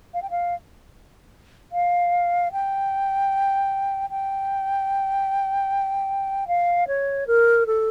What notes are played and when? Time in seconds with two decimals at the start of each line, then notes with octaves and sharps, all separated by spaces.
0.14 F5
0.22 G5
0.30 F5
1.72 F5
2.52 G5
4.10 G5
6.48 F5
6.87 C#5
7.27 A#4
7.67 A4